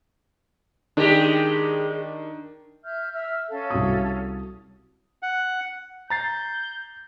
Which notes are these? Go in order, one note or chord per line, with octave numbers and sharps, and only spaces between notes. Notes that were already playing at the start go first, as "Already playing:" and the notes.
D#3 G#3 D4 G4
E5 F6 G6
E5 E6 F6
C#4 A4 F5
C2 F#4 D#6
F#5
A#5 G6 A6 C7